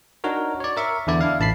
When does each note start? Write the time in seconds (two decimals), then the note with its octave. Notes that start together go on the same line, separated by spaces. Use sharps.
0.24 D4 D#4 F#4 A#4 C#5
0.60 C#5 D5
0.77 A#4 E5 C#6
1.07 E2 D3 E4 D5
1.21 D4 E4 F5
1.40 A1 A5 B5 C7